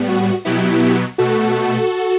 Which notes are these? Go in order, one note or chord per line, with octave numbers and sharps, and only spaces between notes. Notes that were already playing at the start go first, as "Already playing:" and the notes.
Already playing: A2 G3 B3
F#4
B2 F#3 B3 E4 G4
B2 A3 F#4 A4